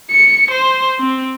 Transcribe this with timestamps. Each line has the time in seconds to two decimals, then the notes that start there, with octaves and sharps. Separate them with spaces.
0.10 C#7
0.52 C5
0.99 C4